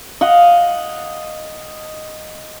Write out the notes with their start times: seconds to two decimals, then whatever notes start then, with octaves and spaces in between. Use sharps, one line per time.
0.21 D#5 F5 F#5